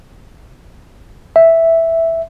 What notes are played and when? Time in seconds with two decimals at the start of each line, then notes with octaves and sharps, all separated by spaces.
1.36 E5